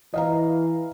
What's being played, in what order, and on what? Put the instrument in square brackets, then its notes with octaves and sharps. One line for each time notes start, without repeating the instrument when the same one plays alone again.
[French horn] E3 [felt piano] D#5 F5 A#5